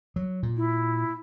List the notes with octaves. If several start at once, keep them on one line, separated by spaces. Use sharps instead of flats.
F#3
A#2
E4